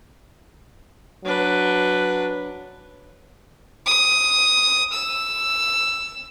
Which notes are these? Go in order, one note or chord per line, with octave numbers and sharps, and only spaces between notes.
F#3 D4 B4
D#6
E6